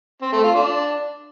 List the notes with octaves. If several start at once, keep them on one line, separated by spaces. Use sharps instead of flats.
C4
A3
F4
D4